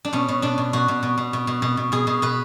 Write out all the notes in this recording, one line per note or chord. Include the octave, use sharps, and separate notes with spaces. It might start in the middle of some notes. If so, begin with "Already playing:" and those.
D4
B2 C#4
B2
B2 D4
B2
B2 F#4
B2
B2
B2
B2
B2
B2
B2
B2 G#4
B2
B2 B4